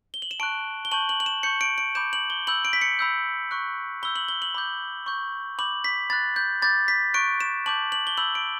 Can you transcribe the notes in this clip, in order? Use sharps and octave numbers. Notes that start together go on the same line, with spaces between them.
G7
F#7
E7
A5 C#6 F#6 D7
G7
A5 C#6 G6 F#7
F#7
F#7
E7
C#6 G6 C#7
D7
D7
B5 D6 G6 E7
F#7
G7
B5 E6 G6 F#7
D7
B6
C#7
B5 E6 G6
C#6 F#6
B5 E6 G6 G7
F#7
G7
F#7
B5 D6 G6
C#6 G6
B5 D6 G6 F#7
B6
B5 F#6 A6
G6
B5 D6 G6 A6
B6
C#6 F#6 D7
E7
A5 D6 G6 F#7
F#7
G7
B5 E6 G6 F#7
D7